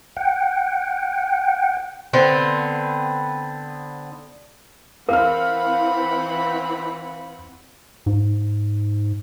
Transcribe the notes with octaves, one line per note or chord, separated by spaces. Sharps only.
F#5 G5
D3 B3 C4
E3 C4 A#4 F5 F#5 B5 F6
G#2